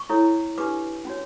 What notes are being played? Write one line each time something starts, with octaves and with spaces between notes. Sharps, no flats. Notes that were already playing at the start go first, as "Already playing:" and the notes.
Already playing: C#6
E4 A4 C#5
D4 G4 B4 D6
C#4 F#4 C#5